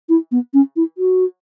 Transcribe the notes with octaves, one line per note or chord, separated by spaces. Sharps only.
E4
B3
C#4
E4
F#4